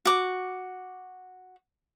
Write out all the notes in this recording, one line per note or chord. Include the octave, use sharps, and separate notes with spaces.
F#4 D6